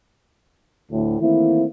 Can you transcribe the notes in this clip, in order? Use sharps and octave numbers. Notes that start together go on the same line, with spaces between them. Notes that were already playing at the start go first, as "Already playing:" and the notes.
D2 A2
D#3 E3 A3 A#3 C4 E4